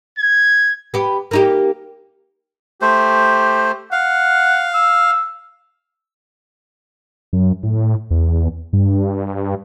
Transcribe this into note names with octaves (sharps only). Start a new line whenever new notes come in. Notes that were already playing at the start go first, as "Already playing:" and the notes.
G#6
B3 G4
A#3 D#4 G4
A3 G4 C5
F5 F#5
E6
F#2
A2
E2
G2